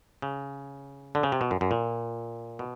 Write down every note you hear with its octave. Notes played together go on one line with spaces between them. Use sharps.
C#3
D3
C#3
C3
B2
F#2
F#2
A#2
B2